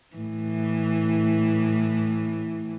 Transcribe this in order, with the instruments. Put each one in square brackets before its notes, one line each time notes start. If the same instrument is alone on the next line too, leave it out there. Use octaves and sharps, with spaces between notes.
[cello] A2 E3